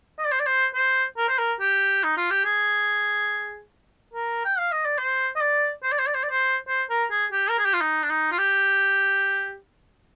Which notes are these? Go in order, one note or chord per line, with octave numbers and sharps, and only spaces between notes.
D#5
D5
C5
D5
C5
C5
A#4
C5
A#4
G4
D#4
F4
G4
G#4
A#4
G5
F5
D#5
D5
C5
D#5
D5
C5
D5
C5
D5
C5
D5
C5
C5
A#4
G#4
G4
A#4
G#4
G4
F4
D#4
D4
D#4
F4
G4